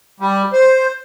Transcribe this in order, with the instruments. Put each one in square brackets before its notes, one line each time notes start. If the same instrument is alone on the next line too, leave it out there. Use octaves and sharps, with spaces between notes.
[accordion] G3
C5